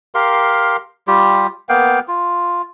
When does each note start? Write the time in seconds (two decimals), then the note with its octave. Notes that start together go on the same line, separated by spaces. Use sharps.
0.15 G4 A#4 F5 C6
1.07 G3 F4 G4
1.69 A#3 B3 F5 G5
2.08 F4